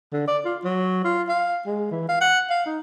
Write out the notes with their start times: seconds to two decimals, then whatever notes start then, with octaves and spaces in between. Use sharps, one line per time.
0.12 D3
0.28 D5
0.45 F4
0.64 F#3
1.04 F4
1.29 F5
1.66 G#3
1.91 E3
2.09 F5
2.21 F#5
2.50 F5
2.66 D#4